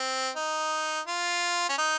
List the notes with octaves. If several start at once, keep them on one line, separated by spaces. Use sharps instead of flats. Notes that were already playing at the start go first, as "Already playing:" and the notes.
Already playing: C4
D#4
F4
C#4
D#4